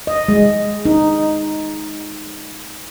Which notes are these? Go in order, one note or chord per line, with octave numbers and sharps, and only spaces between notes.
D#5
G#3
D#4